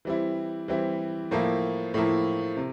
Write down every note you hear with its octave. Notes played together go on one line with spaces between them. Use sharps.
E3 G3 C4 E4
E3 G3 C4 E4
A2 F3 A#3 E4
A2 F3 A#3 E4
C3